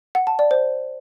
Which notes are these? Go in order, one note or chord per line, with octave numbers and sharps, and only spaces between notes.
F#5
A5
D5
C5